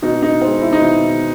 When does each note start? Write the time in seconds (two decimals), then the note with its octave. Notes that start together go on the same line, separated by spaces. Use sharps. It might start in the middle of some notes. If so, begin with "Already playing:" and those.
0.02 B2 D#4
0.23 D#4
0.41 G#3 C4
0.62 E4
0.73 D#4
0.81 B2 E4